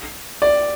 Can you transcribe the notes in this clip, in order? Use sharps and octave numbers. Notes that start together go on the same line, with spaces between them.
D5